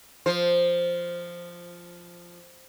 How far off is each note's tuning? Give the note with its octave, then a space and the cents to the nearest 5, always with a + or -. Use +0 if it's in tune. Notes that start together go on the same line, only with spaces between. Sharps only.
F3 +0 C5 +0